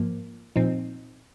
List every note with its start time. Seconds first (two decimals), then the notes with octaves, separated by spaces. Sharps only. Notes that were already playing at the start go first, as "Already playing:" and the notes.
Already playing: G#2 F3 A#3
0.56 A#2 F3 C4 D#4